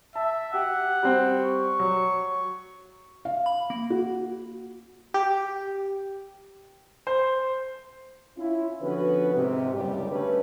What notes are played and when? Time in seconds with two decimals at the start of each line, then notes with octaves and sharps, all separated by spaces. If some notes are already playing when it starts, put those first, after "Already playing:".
0.15 E5 A5
0.54 G4 F#5
1.03 G3 C4 G5
1.42 C#6
1.79 F#3
3.25 F5
3.46 B5
3.70 A#3
3.90 F#4
5.14 G4
7.07 C5
8.38 C#4 E4 F4
8.81 D3 F3 B3 C#4 F#4 B4
9.35 G#2 C3
9.74 F#1 C#2 G3 G4
10.11 D3 G3 A3 C#4 D4 B4